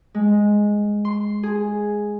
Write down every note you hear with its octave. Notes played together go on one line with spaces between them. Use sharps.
G#3
C6
G#4